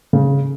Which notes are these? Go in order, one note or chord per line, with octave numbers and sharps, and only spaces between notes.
C#3